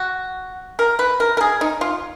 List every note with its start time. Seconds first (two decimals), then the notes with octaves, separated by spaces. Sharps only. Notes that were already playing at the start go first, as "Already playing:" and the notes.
Already playing: F#4
0.79 A#4
0.99 B4
1.20 A#4
1.37 A#4
1.41 G#4
1.61 D#4
1.81 F4